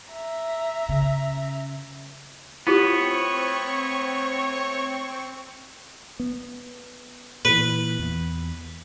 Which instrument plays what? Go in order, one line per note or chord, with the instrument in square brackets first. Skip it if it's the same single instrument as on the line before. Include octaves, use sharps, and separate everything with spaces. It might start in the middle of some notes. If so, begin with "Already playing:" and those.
[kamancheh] E5 A#5
[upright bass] C#3
[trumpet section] A3 C#5 [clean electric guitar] B3 [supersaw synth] C4 C#6 [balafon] E4 F4 G4
[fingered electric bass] B3
[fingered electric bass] A#2 E3 [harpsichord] B4
[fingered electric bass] E2